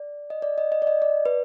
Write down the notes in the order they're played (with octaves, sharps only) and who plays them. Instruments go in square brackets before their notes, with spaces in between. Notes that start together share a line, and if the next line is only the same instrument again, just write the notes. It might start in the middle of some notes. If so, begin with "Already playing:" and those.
Already playing: [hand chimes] D5
D#5
D5
D#5
D#5
D5
D#5
D5
B4